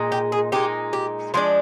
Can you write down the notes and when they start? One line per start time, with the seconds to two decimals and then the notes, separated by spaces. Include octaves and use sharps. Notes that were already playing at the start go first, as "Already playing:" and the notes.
Already playing: A#2 G#3 D#4
0.12 G4
0.32 G#4
0.52 A#2 G#3 D#4 G4
0.93 G4
1.34 F3 G#3 D4 F4